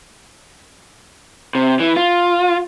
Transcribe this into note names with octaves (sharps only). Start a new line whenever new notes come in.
C3
E3
F4